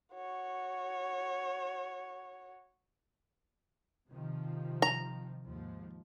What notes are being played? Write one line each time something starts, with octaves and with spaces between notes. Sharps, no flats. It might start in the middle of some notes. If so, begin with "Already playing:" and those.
F#4 C#5
C3 D#3 F3
A#5
D#2 G#2 F3